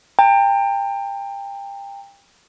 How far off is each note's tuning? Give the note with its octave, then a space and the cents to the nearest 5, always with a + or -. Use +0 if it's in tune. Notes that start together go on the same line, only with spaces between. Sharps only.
G5 +25 A#5 -45